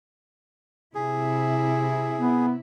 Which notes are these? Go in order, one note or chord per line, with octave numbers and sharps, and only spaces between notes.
C3 E4 G#4
B3